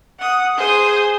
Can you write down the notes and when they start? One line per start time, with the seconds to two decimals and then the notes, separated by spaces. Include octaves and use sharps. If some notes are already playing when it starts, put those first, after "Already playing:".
0.19 F#5 D#6
0.57 G#4 C5 D#6